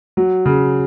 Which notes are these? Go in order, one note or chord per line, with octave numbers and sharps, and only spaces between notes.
F#3
C#3